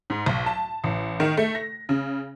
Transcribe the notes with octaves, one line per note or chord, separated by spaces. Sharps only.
G#2
B1
A5
A1
D#3
A3
A#6
C#3